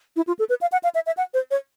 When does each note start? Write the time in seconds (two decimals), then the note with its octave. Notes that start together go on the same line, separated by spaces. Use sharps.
0.16 E4
0.27 F4
0.39 A4
0.49 B4
0.61 F5
0.72 F#5
0.84 F5
0.95 E5
1.06 E5
1.17 F#5
1.34 C5
1.51 C#5